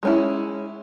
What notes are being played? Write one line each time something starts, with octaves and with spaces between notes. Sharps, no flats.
G#3 C#4 E4